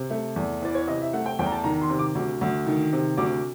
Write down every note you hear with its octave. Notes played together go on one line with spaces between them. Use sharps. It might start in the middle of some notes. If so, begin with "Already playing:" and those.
Already playing: C3
A3
E2
E3 D5
C#5
C3 D#5
E5
A3 F#5
G5
E2 G5
A#5
A5
D#3 A#5
C6
C3
D6
D2
D2
D#3
C3
D2 D6